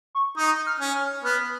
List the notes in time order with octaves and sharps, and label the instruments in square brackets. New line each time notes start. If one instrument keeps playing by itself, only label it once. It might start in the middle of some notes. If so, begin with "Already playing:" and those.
[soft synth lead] C#6
[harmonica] D#4 [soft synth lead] D#6
[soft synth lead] F6
[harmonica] C#4
[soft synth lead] F6
[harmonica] B3 [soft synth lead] F6